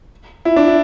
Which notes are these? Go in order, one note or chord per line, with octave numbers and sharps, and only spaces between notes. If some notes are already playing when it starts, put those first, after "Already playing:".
E4
D4
E4